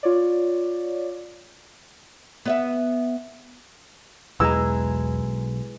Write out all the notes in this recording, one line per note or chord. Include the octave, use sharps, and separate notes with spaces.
F4 C#5 D5
B3 D#5 E5
B1 E2 E3 G#3 A#5 E6